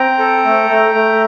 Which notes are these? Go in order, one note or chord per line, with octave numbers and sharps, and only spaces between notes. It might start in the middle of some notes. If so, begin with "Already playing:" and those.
Already playing: C4 G5 A#5
A4
A3
A3
A3